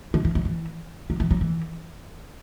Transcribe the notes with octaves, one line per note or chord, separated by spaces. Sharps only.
D3
E3
F#3
E3
F#3
E3
F#3
E3